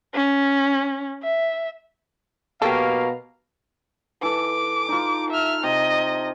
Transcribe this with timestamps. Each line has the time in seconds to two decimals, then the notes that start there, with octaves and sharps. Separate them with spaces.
0.14 C#4
1.23 E5
2.62 B2 F#3 A#3 G4 A4 F5 A#5
4.23 E3 A4 D6
4.89 D#4 F4
5.30 E5 F6
5.63 C3 D#5